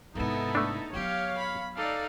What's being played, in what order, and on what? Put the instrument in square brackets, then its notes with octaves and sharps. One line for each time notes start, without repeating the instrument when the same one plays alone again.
[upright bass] G#2 C3 [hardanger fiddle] B3 E4 [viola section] D#4 A4
[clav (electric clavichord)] A3 D4
[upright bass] F#3 B3 [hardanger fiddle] G4 [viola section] C#5 F5
[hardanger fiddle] B5
[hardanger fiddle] D#4 [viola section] A4 D5 F5